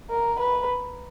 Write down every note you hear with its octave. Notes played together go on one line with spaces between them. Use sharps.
A#4
B4